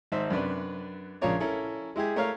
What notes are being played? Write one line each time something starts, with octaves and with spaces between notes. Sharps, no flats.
G#1 D#4 C5 E5
F#2 C3 D4 B4
A#1 C#3 F4 A#4 C#5 D5
C#4 E4 A4 A#4
G#3 E4 G4 G#4
A3 A#4 C#5 F5